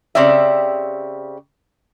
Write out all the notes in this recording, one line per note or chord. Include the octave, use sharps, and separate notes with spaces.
C#3 C4 G4 D5 E5